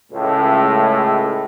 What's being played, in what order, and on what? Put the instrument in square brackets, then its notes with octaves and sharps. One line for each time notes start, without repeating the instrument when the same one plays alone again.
[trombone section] C#2 A2